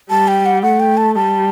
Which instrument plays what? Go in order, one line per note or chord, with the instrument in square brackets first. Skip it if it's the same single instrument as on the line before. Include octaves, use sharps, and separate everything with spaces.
[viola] G3 [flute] A5
[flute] G5
F#5
[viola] A3 [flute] F#5
[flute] G5
A5
[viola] G3 [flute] A5